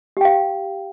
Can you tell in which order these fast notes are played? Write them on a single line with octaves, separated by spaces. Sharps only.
G4 G5 F5